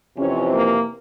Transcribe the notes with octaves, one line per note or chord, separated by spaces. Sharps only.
F2 C3 E3 C#4
A#3